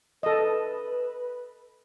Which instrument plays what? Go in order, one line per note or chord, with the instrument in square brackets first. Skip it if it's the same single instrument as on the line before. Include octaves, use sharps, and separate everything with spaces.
[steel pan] A4 D#5 [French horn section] B4